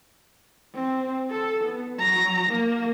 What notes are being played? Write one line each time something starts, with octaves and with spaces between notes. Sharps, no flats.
C4
A4
B3
F#3 A#5
A#3